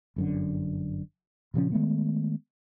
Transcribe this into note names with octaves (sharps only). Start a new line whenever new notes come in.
G1 F#2 D3
A#2 C#3 F3 C#4
D#3 G#3 A3 B3